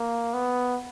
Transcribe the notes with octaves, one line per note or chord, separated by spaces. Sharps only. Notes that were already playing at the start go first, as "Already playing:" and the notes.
Already playing: A#3
B3